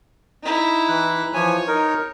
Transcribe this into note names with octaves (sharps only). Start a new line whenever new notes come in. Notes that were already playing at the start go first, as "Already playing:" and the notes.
D#4 E4
E3 F#6
E3 F3 C#5 G#5
D#4 A#4